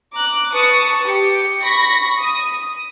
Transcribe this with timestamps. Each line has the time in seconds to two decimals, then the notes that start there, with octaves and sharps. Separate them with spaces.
0.12 A#5 D6 F#6
0.52 B4 A5 C#6 D#6 C#7
1.04 G4 C#7
1.62 B5 C#6 A#6 B6
2.21 D#6